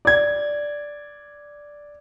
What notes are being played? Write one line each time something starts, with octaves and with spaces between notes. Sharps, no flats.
D5 G#6